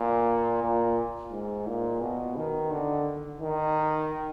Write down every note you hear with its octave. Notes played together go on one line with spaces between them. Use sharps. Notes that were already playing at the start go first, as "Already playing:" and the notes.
Already playing: A#2
A#2
G#2
A#2
B2
D#3
D3
D#3